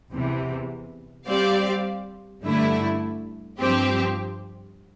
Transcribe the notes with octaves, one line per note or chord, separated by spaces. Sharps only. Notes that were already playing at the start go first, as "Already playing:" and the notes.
E2 C3 E3
G3 C4 G4 D5 F5
G2 D3 A3 E4
G2 F3 C4 G4